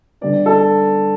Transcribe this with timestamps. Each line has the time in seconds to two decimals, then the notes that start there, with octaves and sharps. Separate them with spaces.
0.21 D3 G3 B3 D5
0.46 A4